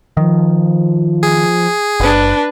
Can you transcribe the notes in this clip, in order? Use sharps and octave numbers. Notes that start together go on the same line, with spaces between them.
D#3 F3
G#4
F#1 D4 B4